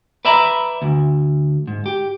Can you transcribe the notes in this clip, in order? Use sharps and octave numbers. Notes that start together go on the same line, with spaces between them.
B4 D5 E5 A#5 B5
D2
G#2
G4